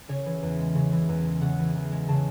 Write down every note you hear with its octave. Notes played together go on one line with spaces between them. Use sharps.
C#3 C#5
E3
E2
G#3
C#3
E3
E2
G#3
C#3 F#5
E3
E2
G#3
C#3 A5